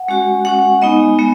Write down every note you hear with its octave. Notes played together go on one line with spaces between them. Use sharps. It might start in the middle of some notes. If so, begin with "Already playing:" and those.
Already playing: F#5
G#3 C#4 F#4
G#3 C#4 F#4 F#5
G#3 B3 D#4 D#5
G#3 B3